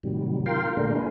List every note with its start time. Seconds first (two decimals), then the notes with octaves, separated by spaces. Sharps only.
0.03 A2 C3 D#3 F#3 G3
0.46 F4 A#4 F5 G5 C6
0.77 A#2 D3 G#3 A3 D4 A#4
0.95 A#3 E4 G#4 B4